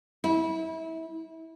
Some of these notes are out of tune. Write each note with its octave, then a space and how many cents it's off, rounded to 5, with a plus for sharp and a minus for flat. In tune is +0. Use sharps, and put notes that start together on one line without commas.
E4 -25